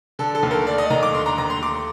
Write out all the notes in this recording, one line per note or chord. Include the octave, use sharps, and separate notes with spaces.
D3 A4
A4
D#2
A#4
A3 D5
D#5
D#2 A#5
D6
D3 C6
A#5
D#2 A#5
C6
A3 D6